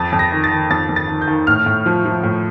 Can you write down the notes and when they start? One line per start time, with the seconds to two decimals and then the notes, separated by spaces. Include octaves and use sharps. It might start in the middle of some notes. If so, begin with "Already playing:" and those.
Already playing: F2 A6
0.12 F2
0.19 A#6
0.32 D#3
0.44 A6
0.51 D#3
0.70 F2 A6
0.89 F2
0.96 A6
1.08 D#3
1.21 G6
1.28 D#3
1.47 A2 F6
1.66 A2
1.86 F3
2.05 F3
2.24 A2